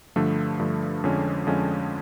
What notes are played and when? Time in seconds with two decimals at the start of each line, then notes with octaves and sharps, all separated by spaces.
0.16 G2 D3 F3 A3
0.59 G2 D3 F3 A3
1.04 F2 D3 F3 G#3 C#4
1.47 F2 D3 F3 G#3 C#4